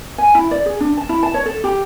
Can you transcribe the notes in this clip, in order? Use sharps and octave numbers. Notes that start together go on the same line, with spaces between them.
G#5
E4
D5
G#4
D4
A5
E4
A5
C#5
A4
G4